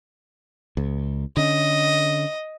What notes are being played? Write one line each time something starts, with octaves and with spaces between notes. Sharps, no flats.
C#2
D3 C#4 D#5